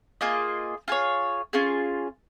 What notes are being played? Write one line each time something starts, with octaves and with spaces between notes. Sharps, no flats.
A#3 F4 G#4 D#5
F4 G#4 C#5
C#4 F4 G#4